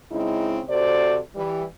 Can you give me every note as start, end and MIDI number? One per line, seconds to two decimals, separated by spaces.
0.12 0.61 49
0.12 0.61 56
0.12 0.61 60
0.12 0.61 63
0.12 0.61 64
0.69 1.18 48
0.69 1.18 66
0.69 1.18 69
0.69 1.18 72
0.69 1.18 74
1.36 1.63 52
1.36 1.63 55